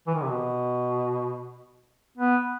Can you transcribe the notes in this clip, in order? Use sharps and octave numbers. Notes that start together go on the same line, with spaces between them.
E3
D#3
C3
B2
B3